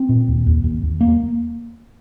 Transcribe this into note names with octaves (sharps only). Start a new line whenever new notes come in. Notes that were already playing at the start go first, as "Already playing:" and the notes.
Already playing: C4
A#2
D#2
D#2
D#2
D#2
A#3